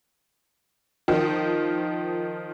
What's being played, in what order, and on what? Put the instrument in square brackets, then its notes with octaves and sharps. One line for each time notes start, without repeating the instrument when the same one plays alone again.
[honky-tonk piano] D#3 F3 D#4